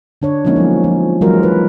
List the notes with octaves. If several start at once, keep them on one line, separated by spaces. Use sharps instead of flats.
D3 D4 C#5
F3 G#3 A#3 C#4 D#4
F3 F#3 B3
F3
E3 F#3 G#3 F4 F#4 A#4
B4